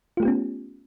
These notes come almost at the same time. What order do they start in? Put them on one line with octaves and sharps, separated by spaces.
F4 A3 G4 B3 C#4